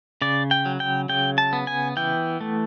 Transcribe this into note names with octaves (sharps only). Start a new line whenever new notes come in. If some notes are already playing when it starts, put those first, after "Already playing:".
C#3 D5
G5
F#3
G5
C#3 G5
A5
B3
G#5
E3 G5
A3